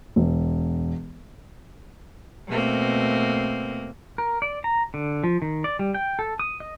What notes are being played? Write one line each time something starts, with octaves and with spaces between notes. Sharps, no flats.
E1
B2 A3 A#3 C4
A#4
D5
A#5
D3
F3
D#3
D5
G3
G5
A4
D#6
D#5